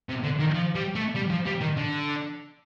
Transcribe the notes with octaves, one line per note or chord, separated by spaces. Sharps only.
C3
D3
D#3
F3
G3
A3
G3
F3
G3
D#3
D3